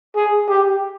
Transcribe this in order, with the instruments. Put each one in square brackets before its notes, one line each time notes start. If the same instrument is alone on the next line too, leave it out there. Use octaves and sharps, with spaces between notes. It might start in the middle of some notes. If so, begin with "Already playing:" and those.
[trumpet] G#4
G4